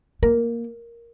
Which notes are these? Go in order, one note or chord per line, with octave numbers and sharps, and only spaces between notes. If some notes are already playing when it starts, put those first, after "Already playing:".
A#3 A#4